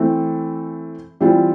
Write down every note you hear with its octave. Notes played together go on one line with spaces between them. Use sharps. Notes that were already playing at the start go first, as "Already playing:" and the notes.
Already playing: E3 A3 C4
E3 G3 C4 F4